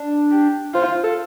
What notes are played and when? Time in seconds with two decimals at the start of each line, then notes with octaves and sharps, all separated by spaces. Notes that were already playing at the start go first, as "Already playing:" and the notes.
Already playing: D4
0.31 G4
0.74 F4 C5
1.04 A4